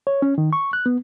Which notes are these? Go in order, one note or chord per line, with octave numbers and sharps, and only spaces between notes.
C#5
C#4
D#3
C#6
F#6
B3